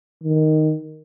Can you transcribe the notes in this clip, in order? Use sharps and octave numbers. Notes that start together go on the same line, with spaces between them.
D#3